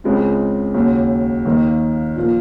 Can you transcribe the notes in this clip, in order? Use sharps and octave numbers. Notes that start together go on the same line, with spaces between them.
C#2 C#3 G#3 C4
D#2 C#3 F#3
D#2 D#3 A#3 D#4
A#2 F3 A#3